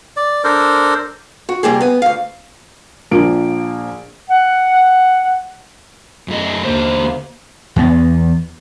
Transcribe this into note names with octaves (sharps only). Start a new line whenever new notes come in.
D5
D4 A4 A#4 C5
F#4
C3 G3 A#3 G4 G#4
B3 G#5
D2 F5
A#1 F3 A#3 D7
F#5
F#2 A3 D#5
D#2 D3 A#3 C5
E2 B3